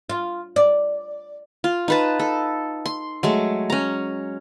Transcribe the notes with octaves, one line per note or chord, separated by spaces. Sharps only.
F4
D5
F4
D#4 B4 A5
A4
C6
F#3 G#3 A3
C#4 A#5